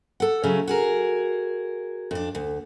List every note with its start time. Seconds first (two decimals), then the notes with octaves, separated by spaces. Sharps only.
0.20 A4 F#5
0.43 C#3 F#3 A3 C#4
0.68 F#4 G#4 A#4
2.11 F2 D4
2.35 D2